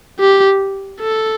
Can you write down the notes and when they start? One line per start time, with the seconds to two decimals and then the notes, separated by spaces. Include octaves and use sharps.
0.20 G4
1.00 A4